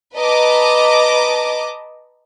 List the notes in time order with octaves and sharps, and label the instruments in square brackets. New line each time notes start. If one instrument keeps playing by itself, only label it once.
[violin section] B4 D#5 A5 A#5 D6